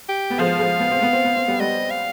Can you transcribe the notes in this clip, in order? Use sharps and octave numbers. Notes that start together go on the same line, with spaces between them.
G4
B3
F3 G#3 F5
F3 G#3
B3
C4
B3
C4
B3
C4
G3 B3
G3 B3 D#5
F5